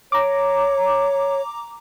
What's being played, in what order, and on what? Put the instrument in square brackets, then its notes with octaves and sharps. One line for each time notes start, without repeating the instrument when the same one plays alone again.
[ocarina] C#5 [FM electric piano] A#5 D6